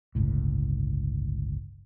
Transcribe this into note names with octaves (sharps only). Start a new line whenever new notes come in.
G1 C#2 A2